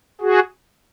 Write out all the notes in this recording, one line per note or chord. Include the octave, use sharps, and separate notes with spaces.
F#4 G#4